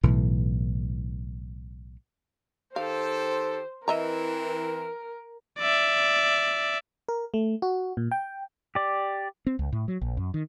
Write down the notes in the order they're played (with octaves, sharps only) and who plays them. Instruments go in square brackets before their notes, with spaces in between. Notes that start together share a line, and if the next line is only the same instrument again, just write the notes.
[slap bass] B1 A2 E3
[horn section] D#3 G4 A4 [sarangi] C5 [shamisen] F5
[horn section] E3 C4 [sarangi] A#4 [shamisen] D#5 E5 A#5
[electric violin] D5 E5
[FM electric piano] A#4
A3
F#4
A#2
G5
[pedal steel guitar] G4 D5
[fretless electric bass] C4
C#2
A2
F#3
A#1
F#2
D#3